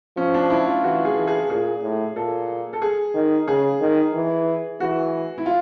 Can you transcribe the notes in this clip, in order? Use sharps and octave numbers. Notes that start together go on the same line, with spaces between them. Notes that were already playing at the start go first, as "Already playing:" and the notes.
F3 C#4
D4
E4
F4
E3 F#4
G#4
E3
G#4
A#2 G#4
A2
A#2 A4
A4
G#4
D#3
C#3 G#4
D#3
E3
E3 F#4
E4
F4